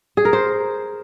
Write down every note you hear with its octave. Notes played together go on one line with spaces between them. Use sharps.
G#4
A#4
C5